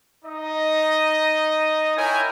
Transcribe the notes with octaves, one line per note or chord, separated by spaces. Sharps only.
D#4 D#5
E4 A#4 C#5 G5 G#5